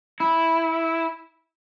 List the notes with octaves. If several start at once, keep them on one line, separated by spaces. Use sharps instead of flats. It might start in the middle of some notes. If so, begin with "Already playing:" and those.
E4